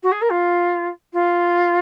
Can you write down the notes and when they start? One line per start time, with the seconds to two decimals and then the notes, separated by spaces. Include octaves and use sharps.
0.02 F#4
0.11 G#4
0.21 A#4
0.30 F4
1.13 F4